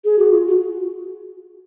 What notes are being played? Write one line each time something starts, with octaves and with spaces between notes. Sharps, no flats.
G#4
F#4
F4
F#4